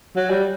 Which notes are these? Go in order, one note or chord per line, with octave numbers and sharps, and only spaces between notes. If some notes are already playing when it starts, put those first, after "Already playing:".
F#3
G3